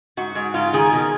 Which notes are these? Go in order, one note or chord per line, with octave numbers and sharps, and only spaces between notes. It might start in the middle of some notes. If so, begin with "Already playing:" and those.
G#2 F#4
G#2
G#2 F4
D#3 G#4
B2